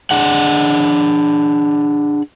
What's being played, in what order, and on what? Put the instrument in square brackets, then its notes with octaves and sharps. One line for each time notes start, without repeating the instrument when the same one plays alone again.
[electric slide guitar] D4 G#4 F#5